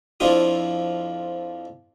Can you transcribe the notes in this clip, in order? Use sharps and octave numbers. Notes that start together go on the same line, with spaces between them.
F2 F3 D4 E4 F4 D#6